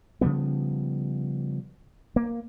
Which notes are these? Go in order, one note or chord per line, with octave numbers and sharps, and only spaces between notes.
C#3 F3 G3 B3
A#3